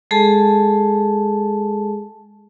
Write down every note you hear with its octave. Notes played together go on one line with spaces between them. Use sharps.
G#3 G#4 A4 A5